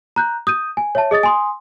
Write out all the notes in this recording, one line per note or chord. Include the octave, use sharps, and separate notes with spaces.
A#5 F#6 G6
D#6 G6 D#7
G#5
C#5 E5 A5
G#4 D#5 D#6 A6
G#5 C6 D#6